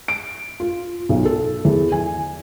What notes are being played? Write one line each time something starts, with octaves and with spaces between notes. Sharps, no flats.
D7
F4
B1
A4
E2
G#5